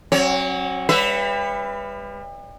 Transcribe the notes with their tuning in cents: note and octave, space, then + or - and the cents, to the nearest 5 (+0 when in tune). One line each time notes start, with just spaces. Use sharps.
F#3 +0 C#4 -45 C#5 +30
G3 +40 B4 +10 E5 +0